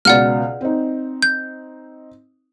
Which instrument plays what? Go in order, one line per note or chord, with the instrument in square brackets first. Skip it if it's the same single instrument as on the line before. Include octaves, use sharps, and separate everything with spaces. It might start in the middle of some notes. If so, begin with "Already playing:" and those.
[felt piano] C#2 B2 [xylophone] D5 F#5 F6
[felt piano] C4 D#4
[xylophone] G6